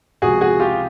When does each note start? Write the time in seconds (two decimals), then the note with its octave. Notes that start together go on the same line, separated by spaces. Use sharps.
0.22 C#2 C3 F3 F#4 G#4
0.41 F#4 G#4
0.60 F4 G4